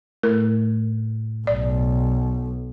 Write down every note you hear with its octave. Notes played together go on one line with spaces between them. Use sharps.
A2 A#4
B1 D5